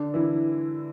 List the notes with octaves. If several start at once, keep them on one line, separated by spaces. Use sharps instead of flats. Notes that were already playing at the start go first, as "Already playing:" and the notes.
Already playing: D3 D4
E3 E4